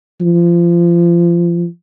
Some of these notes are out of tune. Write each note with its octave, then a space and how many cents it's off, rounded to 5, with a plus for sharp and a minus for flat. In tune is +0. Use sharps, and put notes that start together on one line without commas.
F3 -25